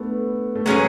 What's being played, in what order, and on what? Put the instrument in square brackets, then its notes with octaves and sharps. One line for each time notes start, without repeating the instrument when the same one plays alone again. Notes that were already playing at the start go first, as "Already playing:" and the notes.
Already playing: [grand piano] A3 B3 D4
A3
[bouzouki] F#3 C#4 G#4 B4 [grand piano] G#3